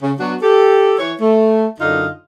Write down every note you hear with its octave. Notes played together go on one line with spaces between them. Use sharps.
C#3
F#3 B3 D4 F#4
G4 A4
E3 C#5
A3
F#2 D3 D#4 F4 D#5